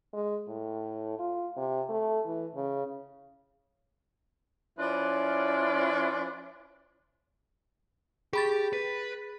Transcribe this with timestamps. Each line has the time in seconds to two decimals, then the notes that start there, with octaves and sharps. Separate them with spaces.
0.13 G#3
0.48 A2
1.19 F4
1.56 C3
1.89 A3
2.26 E3
2.55 C#3
4.79 F3 C#4 E4 B4 D5 C6
8.33 G4 G#4 B5 A6
8.73 B4